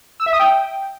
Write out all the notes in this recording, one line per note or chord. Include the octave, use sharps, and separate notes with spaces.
E6
E5
D#6
G5